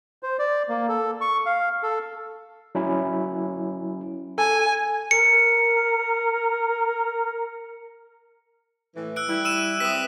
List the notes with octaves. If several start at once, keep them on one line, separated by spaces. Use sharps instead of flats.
C5
D5
A#3
A4
C#6
F5
A4
F#3 C#4 E4
A4 G#5
A#4 C#7
A2 E3
E6 F#6 D7
G3 E4
E6 D#7 E7
C4 B4 E5 D#6 B6